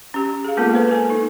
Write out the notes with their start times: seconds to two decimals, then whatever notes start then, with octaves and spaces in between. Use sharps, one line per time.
0.14 C#4 G4
0.45 G#4 F5
0.57 G#3 A#3 B3 F4 A4 A#4
0.74 A4 B4 C5
0.88 A#4 G#5
1.09 D#4 A4